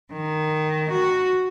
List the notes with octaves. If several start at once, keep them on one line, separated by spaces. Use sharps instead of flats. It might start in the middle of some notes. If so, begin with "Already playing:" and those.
D#3
F#4